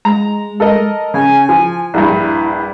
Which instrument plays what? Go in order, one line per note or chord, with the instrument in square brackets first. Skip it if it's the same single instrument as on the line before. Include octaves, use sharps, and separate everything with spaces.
[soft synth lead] G#3 [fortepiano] A#5
[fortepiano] A4 A#4 D#5
[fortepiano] C#3 [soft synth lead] G#5
[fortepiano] F3
[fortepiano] A#1 G2 [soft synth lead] E4